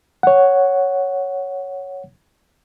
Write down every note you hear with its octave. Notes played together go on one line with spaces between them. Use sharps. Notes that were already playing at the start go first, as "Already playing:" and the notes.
C#5 F#5